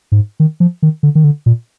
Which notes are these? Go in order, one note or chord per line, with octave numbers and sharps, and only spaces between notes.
G#2
D#3
F3
D#3
D3
D#3
D3
A#2